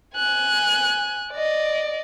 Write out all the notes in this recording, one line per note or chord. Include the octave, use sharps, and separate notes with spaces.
G#5 F#6
D5 D#5